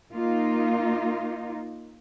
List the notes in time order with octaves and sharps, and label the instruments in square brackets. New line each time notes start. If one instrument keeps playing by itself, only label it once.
[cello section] A#3 D#4 F4